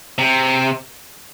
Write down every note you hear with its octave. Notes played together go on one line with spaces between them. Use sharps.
C3